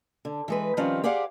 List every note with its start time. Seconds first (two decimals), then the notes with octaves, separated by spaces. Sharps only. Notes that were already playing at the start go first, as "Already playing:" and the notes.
0.25 D3
0.48 E3 G#3 B4
0.77 D#3 F3 G3 C4 C#4 F4
1.04 G4 G#4 C5 D5 F5 F#5